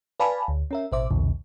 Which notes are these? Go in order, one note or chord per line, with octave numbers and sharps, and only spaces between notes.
B4 D5 F5 G#5 A5 B5
D2
C#4 A#4 E5
A1 B2 C5 E5 D6
B1 E2 A#2 D3